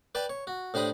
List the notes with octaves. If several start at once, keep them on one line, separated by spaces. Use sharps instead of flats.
B4 D5 G5 A5
C#5
F#4
A2 D4 G4 C5 B5 D#6